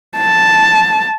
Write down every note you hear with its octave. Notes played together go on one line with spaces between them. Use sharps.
A5